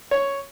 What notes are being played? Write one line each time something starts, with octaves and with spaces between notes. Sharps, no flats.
C#5